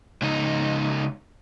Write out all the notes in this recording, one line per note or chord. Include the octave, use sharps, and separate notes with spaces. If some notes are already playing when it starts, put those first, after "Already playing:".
C#2 D#4